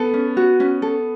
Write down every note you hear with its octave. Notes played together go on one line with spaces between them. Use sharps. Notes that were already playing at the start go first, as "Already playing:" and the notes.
Already playing: B3 A4
C#4
F#4
C#4
A4